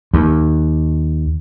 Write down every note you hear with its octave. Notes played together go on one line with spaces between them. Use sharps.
D#2